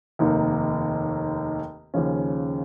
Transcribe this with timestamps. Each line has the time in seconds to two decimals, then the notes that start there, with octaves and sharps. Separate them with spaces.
0.19 F1 D#2 D#3 A#3
1.94 D#2 C#3 F3 C#4